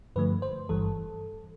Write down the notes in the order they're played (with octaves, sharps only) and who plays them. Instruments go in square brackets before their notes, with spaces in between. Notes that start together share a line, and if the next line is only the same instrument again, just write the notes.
[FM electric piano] G2 D3 F3 A3 B4
C5
G1 G2 E3 G3 A4